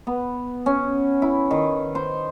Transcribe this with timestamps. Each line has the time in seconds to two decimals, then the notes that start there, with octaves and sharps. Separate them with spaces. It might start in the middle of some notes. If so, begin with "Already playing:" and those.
0.07 B3
0.66 C#4
1.22 E4
1.51 D#3
1.95 C5